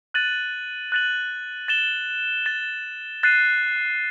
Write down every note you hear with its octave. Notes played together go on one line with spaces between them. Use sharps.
F#6 A6 D#7 F#7
F#6 A6 D#7 F#7
A6 E7 G7
A6 E7 G7
F#6 A6 C7 D#7